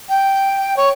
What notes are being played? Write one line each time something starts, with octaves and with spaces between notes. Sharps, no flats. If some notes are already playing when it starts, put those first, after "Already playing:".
G5
C#5